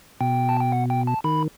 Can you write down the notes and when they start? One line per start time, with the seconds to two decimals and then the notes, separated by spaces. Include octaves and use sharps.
0.21 B2 G5
0.49 A5
0.60 G5
0.72 F#5
0.90 G5
1.07 A5
1.24 D#3 B5